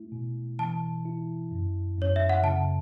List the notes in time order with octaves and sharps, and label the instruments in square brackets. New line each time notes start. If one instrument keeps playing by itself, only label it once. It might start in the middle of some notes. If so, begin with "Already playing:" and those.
Already playing: [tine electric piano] A3 E4
B2
[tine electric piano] E3 [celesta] A5
[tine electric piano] E4
F#2
[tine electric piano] F#2 [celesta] C#5
[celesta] E5
F#5
[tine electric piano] C#3 [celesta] A5